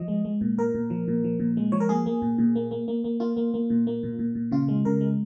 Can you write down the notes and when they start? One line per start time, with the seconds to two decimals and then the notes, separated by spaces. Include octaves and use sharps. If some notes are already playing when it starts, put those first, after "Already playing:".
Already playing: F3 D#5
0.08 G#3
0.25 G#3
0.41 A#2
0.58 A#2 A#4
0.74 A#2
0.90 F3
1.08 A#2
1.24 F3
1.39 A#2
1.57 G#3
1.72 F3 C#5
1.80 A#4
1.89 A#3 G#4
2.06 A#3
2.22 A#2
2.38 A#2
2.55 A#3
2.71 A#3
2.88 A#3
3.04 A#3
3.20 A#3 F4
3.36 A#3
3.54 A#3
3.70 A#2
3.87 A#3
4.03 A#2
4.19 A#2
4.35 A#2
4.51 C#3 F4
4.68 G#3
4.85 C#3 A#4
5.01 G#3